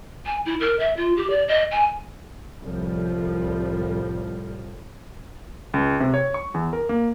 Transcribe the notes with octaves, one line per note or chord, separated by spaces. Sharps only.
G#5
E4
A#4
E5
F4
G4
D5
D#5
G#5
C2 A2 F3 G3
C#2
C3
C#5
C#6
E2
A#4
A#3